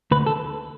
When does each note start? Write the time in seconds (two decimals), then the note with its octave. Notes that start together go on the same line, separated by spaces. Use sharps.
0.11 D2 B4
0.26 A4